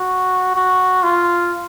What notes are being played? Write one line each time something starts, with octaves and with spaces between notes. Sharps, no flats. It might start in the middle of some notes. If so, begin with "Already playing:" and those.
Already playing: F#4
F#4
F4